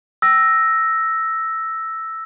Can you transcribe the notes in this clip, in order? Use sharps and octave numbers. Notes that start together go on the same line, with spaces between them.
E6 A#6